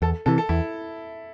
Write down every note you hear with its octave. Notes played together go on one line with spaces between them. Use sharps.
E2 A4
C3 E3 A4
A4
E2 E4